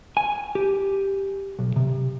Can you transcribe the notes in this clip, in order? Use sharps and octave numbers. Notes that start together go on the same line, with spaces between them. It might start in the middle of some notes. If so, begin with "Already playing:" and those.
G#5
G4
B1
C3